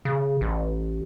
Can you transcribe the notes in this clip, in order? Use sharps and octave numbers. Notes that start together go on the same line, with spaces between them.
C#3
A1